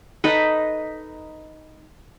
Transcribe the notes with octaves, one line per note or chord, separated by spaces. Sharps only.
D#4 A4 B4